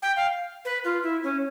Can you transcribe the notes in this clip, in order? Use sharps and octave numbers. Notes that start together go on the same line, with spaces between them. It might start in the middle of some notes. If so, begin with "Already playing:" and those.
G5
F5
B4
F4
E4
C#4